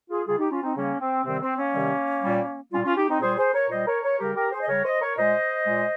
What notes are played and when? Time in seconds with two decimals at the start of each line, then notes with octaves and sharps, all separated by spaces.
0.10 F4 G#4
0.26 C#3 G3 F4 G#4
0.39 D#4 G4
0.51 C#4 F4
0.63 C4 D#4
0.75 C#3 G3 A#3 C#4
1.00 C4
1.25 C3 D#3 G3 C4
1.41 C4
1.57 A#3 C#4
1.74 C3 D#3 G3
2.22 A#2 G3
2.71 A#2 G3 C#4 F4
2.84 C#4 F4
2.96 D#4 G4
3.09 C4 D#4
3.21 A#2 G3 G#4 C5
3.37 G#4 C5
3.53 A#4 C#5
3.70 A#2 G3 C5 D#5
3.86 A#4 C#5
4.03 A#4 C#5
4.19 C#3 G3 G4 A#4
4.35 G4 A#4
4.51 G#4 C5
4.61 D#5
4.68 C#3 G3 A#4 C#5
4.84 C5 D#5
5.01 A#4 C#5
5.17 A#2 G#3 C5 D#5
5.67 A#2 G#3